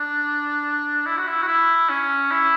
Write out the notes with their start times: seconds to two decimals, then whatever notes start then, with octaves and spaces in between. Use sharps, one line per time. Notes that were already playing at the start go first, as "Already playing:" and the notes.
Already playing: D4
1.06 E4
1.17 F#4
1.27 E4
1.42 F#4
1.48 E4
1.89 C#4
2.31 E4